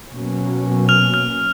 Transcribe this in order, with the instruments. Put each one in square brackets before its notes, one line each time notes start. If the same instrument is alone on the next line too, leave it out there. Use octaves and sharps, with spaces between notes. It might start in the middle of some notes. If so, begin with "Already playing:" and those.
[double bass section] B2 F#3 A#3 C#4
[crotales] F6 F7
F6 F7